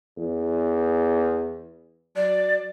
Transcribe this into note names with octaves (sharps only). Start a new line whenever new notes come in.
E2
F#3 D5